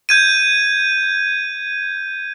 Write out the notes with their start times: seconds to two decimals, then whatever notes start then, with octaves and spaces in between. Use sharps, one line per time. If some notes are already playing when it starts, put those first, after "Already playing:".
0.09 G6 G#6 D#7